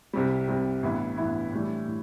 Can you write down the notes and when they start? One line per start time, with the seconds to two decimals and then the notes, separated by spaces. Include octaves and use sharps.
0.13 C2 C3 G3
0.48 C2 C3 G3
0.83 A1 G2 E3 B3 E4
1.17 A1 G2 E3 B3 E4
1.52 A2 E3 G3 D4
1.87 A2